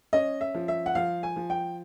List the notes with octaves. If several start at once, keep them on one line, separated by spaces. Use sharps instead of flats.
C#4 D#5
E5
F3
E5
F#5
F3 F5
G#5
F3
G5